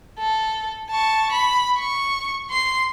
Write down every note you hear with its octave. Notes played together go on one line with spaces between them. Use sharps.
A4
A5 C#6
B5
C#6
C6 C7